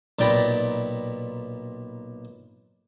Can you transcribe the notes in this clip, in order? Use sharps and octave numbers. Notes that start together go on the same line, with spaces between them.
B1 A#2 D5 G5 A#5 B5